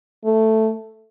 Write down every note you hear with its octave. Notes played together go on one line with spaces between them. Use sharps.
A3